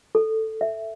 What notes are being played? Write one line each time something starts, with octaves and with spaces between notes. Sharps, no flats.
A4
E5